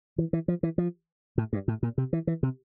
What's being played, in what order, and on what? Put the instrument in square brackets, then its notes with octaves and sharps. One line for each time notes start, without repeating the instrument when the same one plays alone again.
[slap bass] E3
E3
F3
E3
F3
A2
G2
A2
A#2
C3
E3
E3
C3